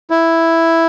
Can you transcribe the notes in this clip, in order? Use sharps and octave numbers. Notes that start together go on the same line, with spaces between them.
E4